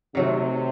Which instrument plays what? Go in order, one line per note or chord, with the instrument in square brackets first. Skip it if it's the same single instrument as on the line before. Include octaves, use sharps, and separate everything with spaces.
[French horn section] C3 [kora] D#3 F#3 A3